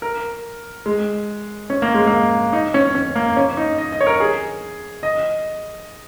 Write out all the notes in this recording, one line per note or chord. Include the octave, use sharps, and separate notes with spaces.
A#4
G#3
C#4
A#3
G#3
A#3
D#4
C#4
C#4
A#3
C#4
D#4
D#5
D#5
C#5
A#4
G#4
D#5